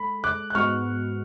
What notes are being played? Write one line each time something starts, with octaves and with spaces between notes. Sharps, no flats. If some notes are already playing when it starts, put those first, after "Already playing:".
Already playing: G#3 A4 B5
D6 F#6
F#6
G#2 G#3 B3 F#4 C#6 F6